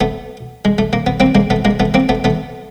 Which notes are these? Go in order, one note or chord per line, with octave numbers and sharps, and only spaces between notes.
A3 B3
G#3
A3
A#3
B3
A#3 C4
G#3 A#3
A3 B3
G#3 A#3
A3 B3
A#3 C4
A3 B3
A3 B3